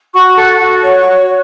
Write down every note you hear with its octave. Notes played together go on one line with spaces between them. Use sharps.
F#4 C#6
A4
F#4
C#5 C#6
C#6
F#4
C#6